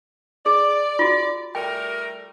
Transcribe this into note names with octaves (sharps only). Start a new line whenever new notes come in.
G#4 D5
F4 F#4
G3 A3 A#4 G5